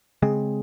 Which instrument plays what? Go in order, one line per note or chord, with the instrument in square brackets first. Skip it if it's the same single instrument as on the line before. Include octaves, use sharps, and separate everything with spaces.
[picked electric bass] C#3 G#3 C4 [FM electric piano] G#4